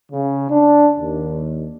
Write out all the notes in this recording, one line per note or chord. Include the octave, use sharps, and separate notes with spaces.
C#3
D4
D#2